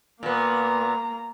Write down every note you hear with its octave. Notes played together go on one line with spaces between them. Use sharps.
A#2 A#3 B3 A#5